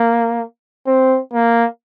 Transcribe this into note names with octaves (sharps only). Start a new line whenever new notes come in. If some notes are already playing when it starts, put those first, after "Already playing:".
Already playing: A#3
C4
A#3